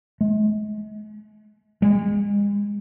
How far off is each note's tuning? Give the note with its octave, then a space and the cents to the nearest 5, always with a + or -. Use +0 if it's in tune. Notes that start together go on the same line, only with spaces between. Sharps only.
G#3 +40
G#3 -35